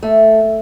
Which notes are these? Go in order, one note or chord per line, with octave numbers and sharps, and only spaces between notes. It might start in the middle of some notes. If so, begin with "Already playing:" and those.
A3